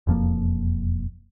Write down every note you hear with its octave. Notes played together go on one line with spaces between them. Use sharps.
E1 F2 F3 A#3